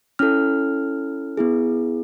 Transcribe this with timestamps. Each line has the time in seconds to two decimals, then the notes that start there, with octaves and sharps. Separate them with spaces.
0.19 C#4 E4 A4 F6
1.37 B3 E4 G#4